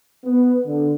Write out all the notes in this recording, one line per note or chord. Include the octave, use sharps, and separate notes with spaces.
B3
D3